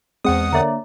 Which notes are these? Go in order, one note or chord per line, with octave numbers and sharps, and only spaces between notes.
E2 G#3 C4 F#5 D#6
D3 A#3 C#5 D5 E5 A#5